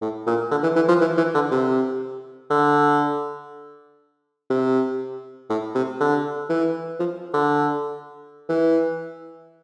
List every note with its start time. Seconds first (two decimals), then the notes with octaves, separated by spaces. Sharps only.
0.01 A2
0.27 A#2
0.51 D3
0.63 E3
0.76 E3
0.89 F3
1.01 E3
1.17 E3
1.34 D3
1.51 C3
2.50 D3
4.50 C3
5.50 A2
5.75 C3
6.00 D3
6.50 E3
7.00 F3
7.33 D3
8.49 E3